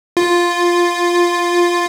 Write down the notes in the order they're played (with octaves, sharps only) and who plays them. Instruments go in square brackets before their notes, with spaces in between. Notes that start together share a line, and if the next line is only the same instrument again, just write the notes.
[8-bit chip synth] F4